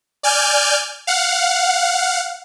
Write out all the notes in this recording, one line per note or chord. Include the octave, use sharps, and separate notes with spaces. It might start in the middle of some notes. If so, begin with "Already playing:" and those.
D5 G#5 F6 G6
F5 F#5